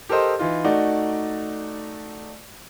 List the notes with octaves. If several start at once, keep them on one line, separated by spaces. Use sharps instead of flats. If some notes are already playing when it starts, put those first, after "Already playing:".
G4 A4 A#4 C5 D#5
E3 D#4 F4
A3 D#4 F#4 D5